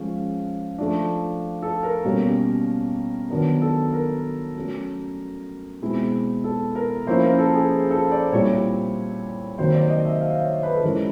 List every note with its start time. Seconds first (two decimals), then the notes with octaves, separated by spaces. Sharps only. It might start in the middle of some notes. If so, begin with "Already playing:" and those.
Already playing: F3 G#3 C#4
0.78 F3 A3 D4
1.63 A4
1.83 A#4
2.05 B2 G3 A#3 C#4
3.30 D#3 F#3 B3 D4 A#4
3.62 A4
3.93 A#4
4.55 F#3 A3 C#4
5.82 B2 G#3 C4 E4
6.44 A4
6.75 A#4
7.07 F3 A#3 C#4 E4 C5
7.23 A#4
7.39 A4
7.54 G#4
7.91 A4
8.12 D5
8.32 A#2 G3 C4 E4 C#5
9.58 C3 D#3 F#3 A#3 C5
9.74 D5
9.90 D#5
10.05 E5
10.21 F5
10.42 C#5
10.63 B4
10.74 A4
10.83 E3 G#3 C#4 E4 A#4